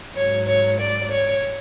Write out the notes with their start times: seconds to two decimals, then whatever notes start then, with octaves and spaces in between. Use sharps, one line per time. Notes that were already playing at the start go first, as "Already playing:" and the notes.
0.16 G#2 F#3 C#5
0.48 C#5
0.80 D5
1.11 C#5